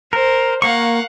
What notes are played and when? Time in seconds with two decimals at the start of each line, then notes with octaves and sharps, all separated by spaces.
0.13 A#4 C5
0.62 A#3 F5 F#5 C#6